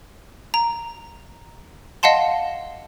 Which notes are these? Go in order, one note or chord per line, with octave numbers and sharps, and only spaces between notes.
A#5
D#5 F5 F#5 A5 C6